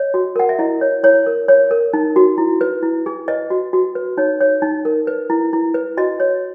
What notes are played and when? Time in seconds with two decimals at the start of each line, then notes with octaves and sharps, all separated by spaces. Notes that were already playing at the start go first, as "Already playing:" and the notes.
Already playing: C#5 D#5
0.14 F#4
0.36 A#4 F#5
0.49 E5
0.59 E4 D#5
0.81 C#5
1.03 E4 C#5
1.27 A#4
1.48 C#5
1.71 A#4
1.93 D#4
2.16 F#4
2.38 E4
2.61 B4
2.82 E4
3.06 G#4
3.28 B4 D#5
3.50 F#4
3.73 F#4
3.95 B4
4.17 D#4 C#5
4.41 C#5
4.62 D#4
4.85 A#4
5.07 B4
5.30 E4
5.53 E4
5.74 B4
5.97 F#4 D#5
6.20 C#5